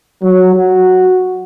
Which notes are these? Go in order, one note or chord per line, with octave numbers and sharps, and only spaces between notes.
F#3
F#4